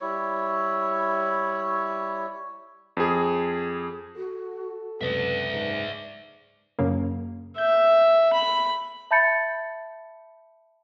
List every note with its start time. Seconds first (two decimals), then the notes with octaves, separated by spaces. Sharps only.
0.01 G3 E4 C#5
2.97 F2 G#4
4.16 F#4 A4
5.01 F#1 C#2 C3 B4 D5 E5
5.52 G#2
6.79 F#2 C#3 A#3
7.58 E5 G6
8.33 B5
9.11 E5 A5 B5 G6 A6 C#7